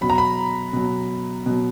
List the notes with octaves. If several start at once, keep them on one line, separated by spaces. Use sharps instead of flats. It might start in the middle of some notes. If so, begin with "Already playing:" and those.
B2 F#3 B5
A#5
B5
B2 F#3
B2 F#3